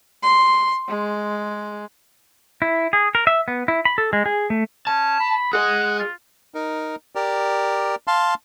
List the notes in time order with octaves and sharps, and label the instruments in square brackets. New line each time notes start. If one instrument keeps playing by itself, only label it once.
[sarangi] C6
G#3
[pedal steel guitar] E4
G#4
A#4
E5
B3
E4
B5
A4
G#3
G#4
A3
[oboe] C#4 [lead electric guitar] A5
[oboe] B5
[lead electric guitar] G#4 D#5 [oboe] F#5
[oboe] F4
[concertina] D#4 A#4
G4 A#4 D5
F5 A5 C6